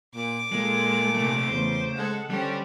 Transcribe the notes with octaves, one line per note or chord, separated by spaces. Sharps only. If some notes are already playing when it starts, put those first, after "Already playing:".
A#2 D6
A#2 G#3 A4
C3 A3
E2 C#3 A3 C5
G#3 A4 F#5
D3 G3 C#4 G4 C5